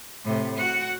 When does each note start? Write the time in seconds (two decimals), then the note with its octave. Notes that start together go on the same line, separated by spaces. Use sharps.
0.24 A2 C3
0.57 F#4 F#5